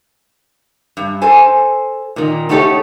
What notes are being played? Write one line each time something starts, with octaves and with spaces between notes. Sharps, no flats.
G2
A4 C5 G#5
A#2 D#3
A3 D#4 F#4 G4 A4 C#5